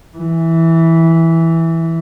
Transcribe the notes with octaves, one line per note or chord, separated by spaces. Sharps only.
E3